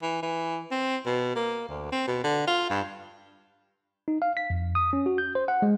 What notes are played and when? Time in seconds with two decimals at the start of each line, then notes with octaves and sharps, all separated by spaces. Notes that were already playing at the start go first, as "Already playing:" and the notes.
0.02 E3
0.22 E3
0.71 C4
1.06 B2
1.36 A#3
1.68 D2
1.92 C4
2.08 B2
2.24 D3
2.47 F4
2.70 G2
4.08 D#4
4.22 F5
4.37 B6
4.50 F2
4.75 D#6
4.93 C#4
5.06 F#4
5.18 G6
5.35 C5
5.48 F#5
5.62 G#3